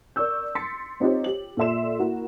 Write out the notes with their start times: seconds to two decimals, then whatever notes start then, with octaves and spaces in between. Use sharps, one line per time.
0.16 A#4 D5 C#6 E6 G6
0.55 C6 A6 B6 C#7
1.00 C4 D#4 F4 G4 C5 C#5
1.24 G4 F#7
1.57 A#2 A4 D5 E5 C6 E7
1.99 A#3 E4 F#4 A#4